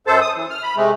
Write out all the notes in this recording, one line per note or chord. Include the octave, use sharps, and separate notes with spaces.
F#2 A4 C5 A5
D#6
E3
F6
B5
C3 G#3 A3